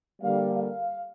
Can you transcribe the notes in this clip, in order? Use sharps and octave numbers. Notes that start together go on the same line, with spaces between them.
D3 G3 A#3 F5
F5